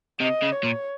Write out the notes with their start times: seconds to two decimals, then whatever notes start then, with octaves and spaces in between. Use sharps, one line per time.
0.20 C3 D#5
0.42 C#3
0.52 C#5
0.63 A#2